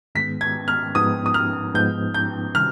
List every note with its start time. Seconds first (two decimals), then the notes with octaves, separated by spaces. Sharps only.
0.15 G#2 D#3 G#3 B3 B6
0.41 G#6
0.68 F6
0.95 G#2 F3 B3 D#4 D#6
1.26 D#6
1.34 F6
1.74 G#2 F3 B3 D#4 G6
2.14 G6
2.54 C3 D#3 G3 F6